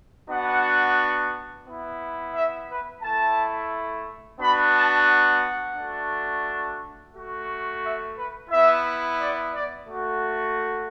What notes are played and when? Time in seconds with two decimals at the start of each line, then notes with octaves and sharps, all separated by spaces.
0.29 B3 D4 F#4 F#5
1.66 B3 E4
2.34 E5
2.69 B4
3.02 A3 E4 A5
4.39 B3 D4 F#4 B5
4.73 A5
5.08 F#5
5.77 A3 D4 F#4
7.13 A3 F#4
7.82 E5
8.16 B4
8.50 B3 E4 E5
9.19 D5
9.53 D5
9.87 A3 F#4